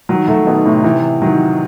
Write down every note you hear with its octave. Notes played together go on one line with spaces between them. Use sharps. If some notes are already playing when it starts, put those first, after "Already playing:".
D#3 F#3
F#3 A3
B2 D#3
A2 C3
C3 E3
D#3 F#3